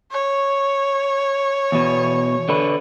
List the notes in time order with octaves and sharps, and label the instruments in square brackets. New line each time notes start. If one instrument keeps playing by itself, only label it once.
[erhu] C#5
[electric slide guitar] E2 B2
D3 B4